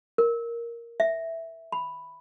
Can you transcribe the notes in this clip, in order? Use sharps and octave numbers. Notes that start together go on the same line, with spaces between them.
A#4
E5
B5